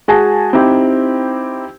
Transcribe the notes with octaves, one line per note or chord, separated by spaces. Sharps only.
G#3 F#4 G#4 G#5 A5 A#6
C4 D#4 E4 G4